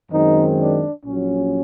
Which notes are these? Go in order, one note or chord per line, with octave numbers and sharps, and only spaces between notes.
F#2 D#3 G#3 C4 D#4
D4
A#1 A#2 F#3 C#4